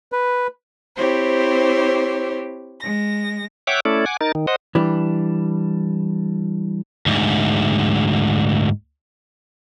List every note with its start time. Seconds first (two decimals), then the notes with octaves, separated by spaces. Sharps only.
0.12 B4
0.96 C4 E4 G4 C5 C#5
2.79 G#3 A#6
3.67 C#5 E5 F#5 G5 D6
3.85 A3 C#4 E4 A4 D5
4.06 F#5 G#5 D6
4.21 D#4 A#4 A6
4.35 D#3
4.47 C5 D#5 F#5
4.75 E3 G3 D4
7.06 D2 G#2